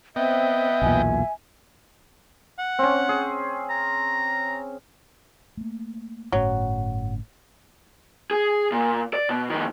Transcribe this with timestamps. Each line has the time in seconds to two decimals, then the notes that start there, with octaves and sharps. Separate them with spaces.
0.16 B3 C4 D#5 E5 G5
0.82 B1 E2 A#2 G#5
2.59 F#5
2.79 C4 C#4
3.09 G#4
3.70 A#5
5.57 A3 A#3
6.32 G1 A2 F#3 C#4
8.31 G#4
8.72 A#2
9.14 D5
9.29 B2
9.50 F2 D#3